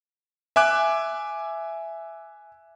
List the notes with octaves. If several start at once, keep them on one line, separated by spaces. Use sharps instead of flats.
E5 G#5 D6 F#6